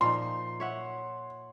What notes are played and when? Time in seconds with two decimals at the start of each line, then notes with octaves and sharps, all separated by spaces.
0.01 A#2 F3 D#4 C6
0.60 C#5 E5 F#5